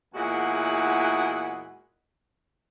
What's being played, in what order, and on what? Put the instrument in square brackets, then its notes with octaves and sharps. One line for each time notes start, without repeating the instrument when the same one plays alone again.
[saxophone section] E2 A#2 G#3 E4 F#4 F#5